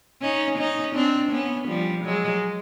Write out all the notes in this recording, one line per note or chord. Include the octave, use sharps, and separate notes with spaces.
C#4 D#4
C#4 D#4
C4 D4
B3 C#4
F3 G3
F#3 G#3